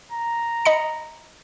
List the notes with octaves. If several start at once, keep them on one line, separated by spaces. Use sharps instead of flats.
A#5
D#5 B5 C#7